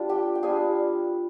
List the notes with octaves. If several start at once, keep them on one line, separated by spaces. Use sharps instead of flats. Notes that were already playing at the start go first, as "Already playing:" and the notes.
Already playing: G3 D4 F4
G4 G5
G5
G3 D4 F4 G#4 G#5